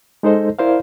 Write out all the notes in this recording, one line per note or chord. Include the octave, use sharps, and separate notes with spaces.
G#3 D#4 A4 C5 D#5
E4 A#4 C5 D5 F5